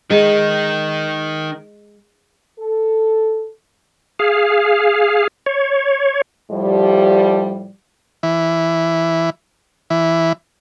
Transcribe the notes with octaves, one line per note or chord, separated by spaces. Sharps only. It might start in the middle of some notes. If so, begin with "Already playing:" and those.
D#3 G#3 D#4
A4
G#4 F5
C#5
A2 F3 G3
E3
E3